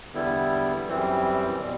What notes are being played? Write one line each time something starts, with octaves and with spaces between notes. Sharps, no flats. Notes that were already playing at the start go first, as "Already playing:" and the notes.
E2 D3 G3 B3 E4
F#2 E3 G3 C4
B2 G3